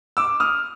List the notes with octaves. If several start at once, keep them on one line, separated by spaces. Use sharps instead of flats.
D6 E6
D#6 F6